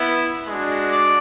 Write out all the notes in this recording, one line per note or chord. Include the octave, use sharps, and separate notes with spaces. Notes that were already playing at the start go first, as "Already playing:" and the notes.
Already playing: B3 E4
G#3 D4 F#4
D5